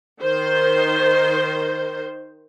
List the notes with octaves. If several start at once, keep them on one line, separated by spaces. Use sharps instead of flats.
D#3 C5